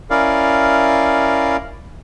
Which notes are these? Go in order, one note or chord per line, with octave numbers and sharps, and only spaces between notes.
C#4 E4 A#4 D5 F5